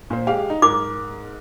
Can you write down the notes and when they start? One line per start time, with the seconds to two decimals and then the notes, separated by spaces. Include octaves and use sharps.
0.10 A#2 C5
0.27 G#3 G4 F5
0.50 D#4
0.62 G#2 A#4 D6